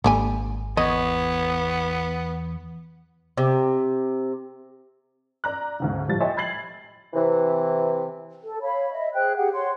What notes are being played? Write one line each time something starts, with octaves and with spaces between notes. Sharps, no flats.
G#1 D3 G3 A#3 G#5
E2 B3 C#5 D#5
C3
D5 A#5 F#6
D2 G#2 C#3
A2 F3 G3 A6
C#5 D#5 E5 G5 G#5 C6
B5 G#6 A6 C7 F#7
C3 E3
A4
C#5 F5 B5
D#5 E5
G#4 C5 G5 F#6
G4 G#4 F#5 G5
C#5 F#5 C6